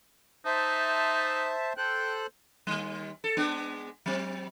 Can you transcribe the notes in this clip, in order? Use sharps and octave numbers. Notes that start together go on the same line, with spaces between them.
D#4 C5 E5 A5
A4 C5 G5 F#6
D#2 G3
A4
G#3 B3 D4
F#3 C4